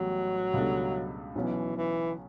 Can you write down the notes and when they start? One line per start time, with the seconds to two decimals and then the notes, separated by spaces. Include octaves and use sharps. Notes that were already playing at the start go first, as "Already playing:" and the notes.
Already playing: A1 A2 F#3 G3 B3
0.53 C#2 B2 G3 D4 A4
1.35 B1 B2 E3 F#3 C#4
1.76 E3